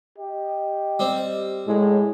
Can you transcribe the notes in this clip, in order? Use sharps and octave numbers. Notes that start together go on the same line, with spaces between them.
G4 D#5
G3 C4
A2 G#3 G#4 C#5 D5